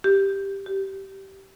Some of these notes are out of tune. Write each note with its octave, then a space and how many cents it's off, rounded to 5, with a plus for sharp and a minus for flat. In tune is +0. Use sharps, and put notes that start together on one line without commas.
G4 +5
G4 -15